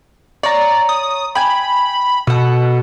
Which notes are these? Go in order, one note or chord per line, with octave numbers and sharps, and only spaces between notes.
C#5 D5 A#5
D#6
G5 G#5 B5
B2 A4 F#5